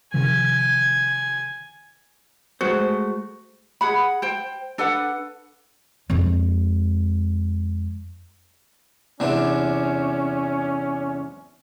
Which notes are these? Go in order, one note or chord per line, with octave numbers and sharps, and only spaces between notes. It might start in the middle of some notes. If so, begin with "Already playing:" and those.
C3 D#3 F3 G#5
G#3 A3 F#4 C5
G#4 F#5 B5
C5 G5
D4 A4 B4 F#5
F2 G#3
E2 C3 C#4 D4